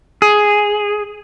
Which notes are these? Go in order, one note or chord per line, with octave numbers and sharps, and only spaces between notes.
G#4